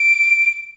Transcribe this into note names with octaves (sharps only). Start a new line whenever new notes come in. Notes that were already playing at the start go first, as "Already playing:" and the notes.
Already playing: D7